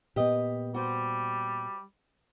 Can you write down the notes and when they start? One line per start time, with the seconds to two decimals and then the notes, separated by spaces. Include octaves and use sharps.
0.16 A#2 B3 G4 B4 D#5
0.74 G3 F#4 C5